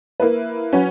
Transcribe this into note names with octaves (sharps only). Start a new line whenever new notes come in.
A#3 E4 B4
F#3 C#4 F#4 B4